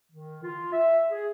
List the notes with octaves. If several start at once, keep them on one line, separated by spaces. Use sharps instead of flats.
D#3
F4
E5
G#4